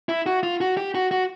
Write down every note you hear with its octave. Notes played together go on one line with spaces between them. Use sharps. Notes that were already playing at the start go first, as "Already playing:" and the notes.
E4
F#4
F4
F#4
G4
F#4
F#4